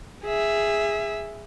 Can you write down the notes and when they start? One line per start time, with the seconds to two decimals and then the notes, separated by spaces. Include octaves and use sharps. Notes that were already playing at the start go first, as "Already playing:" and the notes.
0.24 G#4 E5